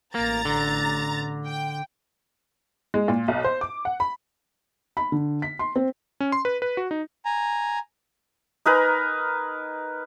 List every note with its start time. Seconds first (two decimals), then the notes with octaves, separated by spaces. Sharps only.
0.15 A1 A#3 A#5 A6
0.45 D3
1.46 G5
2.94 G#3
3.08 A#2
3.28 B1
3.44 C5
3.61 D6
3.85 F#5
4.00 B5
4.97 B5
5.12 D3
5.42 B6
5.59 C6
5.76 C4
6.20 C#4
6.32 C6
6.45 B4
6.62 B4
6.77 F#4
6.91 D#4
7.25 G#5 A#5
8.66 D#4 A#4 B4 G#5